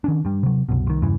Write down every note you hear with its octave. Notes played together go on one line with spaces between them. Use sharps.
D#3 C#4 D4
G2 G3
C3 F#3
C2 F#2 B2
C2 D#3
E2 G2 C#3 E3